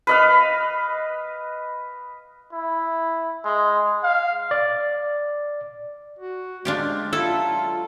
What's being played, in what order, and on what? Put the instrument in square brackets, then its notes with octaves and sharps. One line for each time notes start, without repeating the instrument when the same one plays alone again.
[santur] B4 D#5 F5
[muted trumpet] E4
G#3
F5
[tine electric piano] D5
[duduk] F#4
[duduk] G#3 [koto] D4 F4 G4
[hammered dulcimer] F#3 F5 [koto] E4 [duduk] F4 [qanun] A4